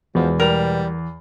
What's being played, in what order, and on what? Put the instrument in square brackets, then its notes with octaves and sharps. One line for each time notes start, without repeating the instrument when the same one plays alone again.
[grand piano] E2 [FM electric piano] B2 G#3 B3 [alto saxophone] F3
[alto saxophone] G3 [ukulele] A#4